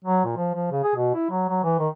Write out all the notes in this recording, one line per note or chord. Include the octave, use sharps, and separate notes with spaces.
F#3
A#2
F3
F3
C#3
G#4
B2
E4
F#3
F#3
E3
D#3